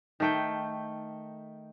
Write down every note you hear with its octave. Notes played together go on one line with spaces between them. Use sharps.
D#3 A3 G5